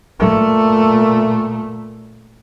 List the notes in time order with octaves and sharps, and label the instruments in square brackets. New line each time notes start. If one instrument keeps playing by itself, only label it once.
[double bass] A#2 A3